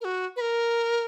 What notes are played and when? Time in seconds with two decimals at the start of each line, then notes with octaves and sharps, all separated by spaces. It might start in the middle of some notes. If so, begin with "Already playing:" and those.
0.01 A#4
0.05 F#4
0.36 B4
0.41 A#4